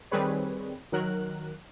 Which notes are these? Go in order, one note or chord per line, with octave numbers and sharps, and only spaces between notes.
D#3 G3 C4 G#4 B4 C#5
D#3 F#3 A#4 F#6